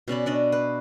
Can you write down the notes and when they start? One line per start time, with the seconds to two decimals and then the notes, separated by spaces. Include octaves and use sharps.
0.08 B2 C#4 D5 B5
0.26 D4 D5 D#5
0.52 B4